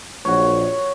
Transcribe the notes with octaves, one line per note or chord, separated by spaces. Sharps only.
A#1 F#4 C#5